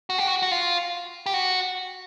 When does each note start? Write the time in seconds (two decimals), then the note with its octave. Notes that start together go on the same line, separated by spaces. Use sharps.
0.10 F#4
0.18 G4
0.27 F#4
0.43 F#4
0.51 F4
1.26 G4
1.34 F#4